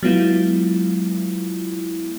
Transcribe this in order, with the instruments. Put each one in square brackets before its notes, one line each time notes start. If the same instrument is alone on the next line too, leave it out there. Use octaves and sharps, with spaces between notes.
[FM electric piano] F#3 G#3 B3 E4 F4